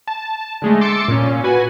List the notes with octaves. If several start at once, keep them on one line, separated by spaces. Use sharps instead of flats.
A5
D3 G#3 A3
C6 D6 E6 A6 C#7
A#2 C#4
F#4 B4 G#5